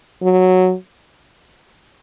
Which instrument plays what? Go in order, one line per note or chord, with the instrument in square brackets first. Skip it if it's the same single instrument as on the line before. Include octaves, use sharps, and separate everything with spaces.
[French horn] F#3